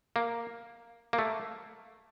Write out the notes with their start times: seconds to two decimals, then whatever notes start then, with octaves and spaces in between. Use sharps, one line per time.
0.16 A#3
1.13 A#3
1.19 A3